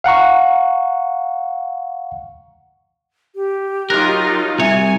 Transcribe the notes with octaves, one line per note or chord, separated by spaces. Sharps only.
F5 F#5 A#5 C#6
G4
F#3 D#4 F4 A#4 F#6
C2 E4 C#5 E5 G#5